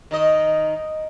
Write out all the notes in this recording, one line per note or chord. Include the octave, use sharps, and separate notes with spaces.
D#3 D#4 D#5